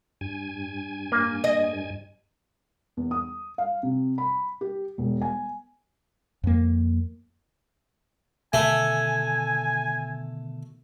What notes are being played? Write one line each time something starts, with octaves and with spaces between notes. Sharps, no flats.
G2 G#5
A#3
D#5
E2
D#6
F5
C3
B5
G4
E1
G#5
F2 A#3
B2 D3 D#3 A3 G#5